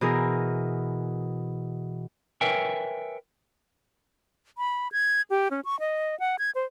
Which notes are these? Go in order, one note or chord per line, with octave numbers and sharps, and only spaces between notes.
B2 E3 G#4 A#4
A#4 B4 C#5 E5 G5 G#5
B5
G#6
G4
C#4
C#6
D#5
F#5
G#6
C5